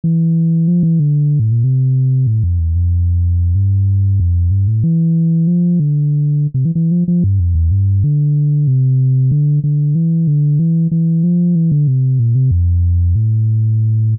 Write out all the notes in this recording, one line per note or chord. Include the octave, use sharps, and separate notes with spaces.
E3
F3
E3
D3
A2
A#2
C3
A2
F2
E2
F2
G2
F2
G2
A2
E3
F3
D3
C3
E3
E3
F3
F3
G2
F2
E2
G2
D3
C3
D3
D3
E3
D3
E3
E3
F3
E3
D3
C3
A#2
C3
F2
A2